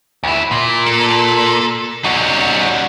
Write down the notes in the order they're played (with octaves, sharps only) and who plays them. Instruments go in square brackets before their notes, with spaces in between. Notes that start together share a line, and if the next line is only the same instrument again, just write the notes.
[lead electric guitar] D2 E4
A#2
[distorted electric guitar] A4
[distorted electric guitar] G3 C#4 [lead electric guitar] D#4 F#4